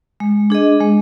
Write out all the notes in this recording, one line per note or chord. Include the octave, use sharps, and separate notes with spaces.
G#3
D4 G#4 D#5
G#3